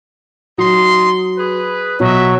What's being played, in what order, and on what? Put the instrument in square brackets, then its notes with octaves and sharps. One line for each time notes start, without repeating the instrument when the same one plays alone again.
[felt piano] F#3 [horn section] D#4 C6
[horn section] G#4 B4
[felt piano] B2 [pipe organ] F#3 [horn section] F#4 D#5 E5